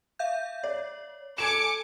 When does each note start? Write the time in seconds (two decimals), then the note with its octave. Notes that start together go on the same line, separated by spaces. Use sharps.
0.19 E5 F5 G6
0.64 C#5 D5
1.38 A4 G#5 D6 G#6 C#7 E7